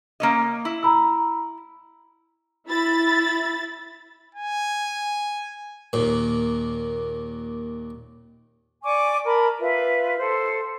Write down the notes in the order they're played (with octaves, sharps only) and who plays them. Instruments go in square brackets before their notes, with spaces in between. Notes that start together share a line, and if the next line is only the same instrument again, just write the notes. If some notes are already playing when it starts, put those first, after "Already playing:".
[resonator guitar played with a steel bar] A#3 C#4 D#5
E4
[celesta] A#5 B5 E6
[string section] E4 B5 A6
[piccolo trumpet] G#5
[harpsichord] D#2 A#2
[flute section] D5 G#5 C#6 D6
A#4 A5 B5
F4 B4 E5
A4 C5